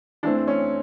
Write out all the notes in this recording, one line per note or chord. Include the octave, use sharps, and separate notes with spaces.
E3 A3 C4 D4
C#4